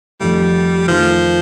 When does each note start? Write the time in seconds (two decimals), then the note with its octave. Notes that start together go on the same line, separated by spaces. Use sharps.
0.21 F2 D#3 G3 A3
0.88 F2 D#3 F3 A3